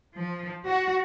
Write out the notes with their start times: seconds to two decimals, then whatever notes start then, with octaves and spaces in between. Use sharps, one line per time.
0.17 F3
0.67 F#4